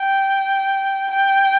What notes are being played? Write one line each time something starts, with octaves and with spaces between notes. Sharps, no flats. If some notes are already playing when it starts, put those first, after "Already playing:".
Already playing: G5
G5